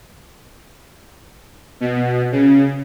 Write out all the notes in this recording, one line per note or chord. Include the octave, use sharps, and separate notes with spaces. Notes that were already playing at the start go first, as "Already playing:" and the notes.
B2
C#3